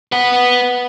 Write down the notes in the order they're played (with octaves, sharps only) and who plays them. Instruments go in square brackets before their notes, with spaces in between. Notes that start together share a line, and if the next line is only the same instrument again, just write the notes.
[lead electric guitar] B4 F#5